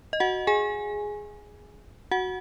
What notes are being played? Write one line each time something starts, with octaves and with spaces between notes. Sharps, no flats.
D#5
F#4 F#5
G#4 G#5
F#4 F#5